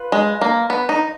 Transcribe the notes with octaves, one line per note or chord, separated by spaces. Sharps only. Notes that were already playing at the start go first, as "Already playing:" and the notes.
Already playing: F4 B4
G#3
A#3
B3
D#4